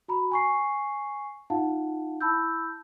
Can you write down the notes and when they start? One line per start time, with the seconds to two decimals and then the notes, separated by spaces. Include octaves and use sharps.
0.08 F#4 A#5 B5
0.31 G#5 C#6 C7
1.50 D#4 F4 F5 F#5 A5
2.21 E4 A5 B5 E6 G6